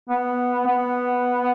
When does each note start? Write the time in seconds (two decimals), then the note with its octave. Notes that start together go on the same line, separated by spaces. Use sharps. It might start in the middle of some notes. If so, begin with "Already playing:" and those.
0.09 B3
0.67 B3